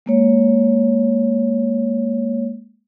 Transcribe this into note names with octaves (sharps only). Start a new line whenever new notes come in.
G#3 A#3 C#5